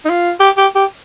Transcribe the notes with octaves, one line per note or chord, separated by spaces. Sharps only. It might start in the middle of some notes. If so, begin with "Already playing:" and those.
D#4
F4
G4
G4
G4